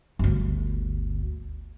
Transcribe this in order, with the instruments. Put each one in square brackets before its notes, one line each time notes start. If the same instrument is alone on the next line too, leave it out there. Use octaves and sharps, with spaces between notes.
[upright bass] G1 D2